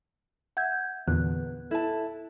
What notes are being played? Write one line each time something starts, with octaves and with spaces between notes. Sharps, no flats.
E5 F#5 G6 G#6
E2 A#2 D3 B3 F#6
E4 A4 A5